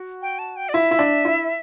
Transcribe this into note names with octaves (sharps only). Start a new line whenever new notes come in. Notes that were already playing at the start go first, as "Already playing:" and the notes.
Already playing: F#4
G5
A5
G5
D5
E4 E5
E4
D4
E4